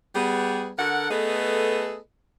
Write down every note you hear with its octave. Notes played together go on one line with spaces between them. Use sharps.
G3 B3 G#4
D3 A4 A#4 F#5
A3 B3 G#4 A4 B4 D#5